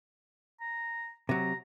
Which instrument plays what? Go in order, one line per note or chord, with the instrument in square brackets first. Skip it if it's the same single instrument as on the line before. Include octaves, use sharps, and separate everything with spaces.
[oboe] A#5
[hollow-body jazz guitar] C3 F#3 [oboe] A#5